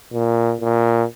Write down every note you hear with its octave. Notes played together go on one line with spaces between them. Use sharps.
A#2
A#2